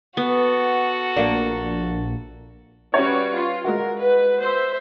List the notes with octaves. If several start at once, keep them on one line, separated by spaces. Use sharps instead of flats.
B3 F#4 A4
A#1 A#3 D4
G3 C#4 F#4 B4 C#5
F4
G#3 F#4 A#4
B4
C5 E5